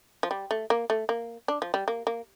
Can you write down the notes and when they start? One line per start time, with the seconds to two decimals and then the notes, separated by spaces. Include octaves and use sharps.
0.23 F3
0.31 G3
0.51 A3
0.70 A#3
0.90 A3
1.09 A#3
1.48 D4
1.62 F3
1.74 G3
1.88 A#3
2.07 A#3